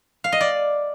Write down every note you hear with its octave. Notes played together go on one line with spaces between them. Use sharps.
F5
D#5
D5